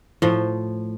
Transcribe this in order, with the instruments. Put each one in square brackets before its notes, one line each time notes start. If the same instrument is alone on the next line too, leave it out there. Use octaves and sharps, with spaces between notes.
[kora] A2 F3